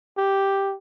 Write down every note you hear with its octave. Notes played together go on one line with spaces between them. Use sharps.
G4